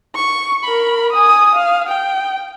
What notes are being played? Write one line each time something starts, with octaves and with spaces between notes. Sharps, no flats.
C#6
A#4 B5
G#5 D#6
F5
G5